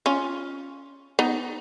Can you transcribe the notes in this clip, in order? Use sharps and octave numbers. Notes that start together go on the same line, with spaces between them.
C#4 F4
B3 D#4